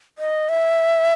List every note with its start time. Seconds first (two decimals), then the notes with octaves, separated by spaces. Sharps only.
0.18 D#5
0.49 E5